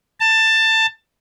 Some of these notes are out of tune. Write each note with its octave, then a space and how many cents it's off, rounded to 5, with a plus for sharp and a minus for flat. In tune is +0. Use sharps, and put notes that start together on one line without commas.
A5 +15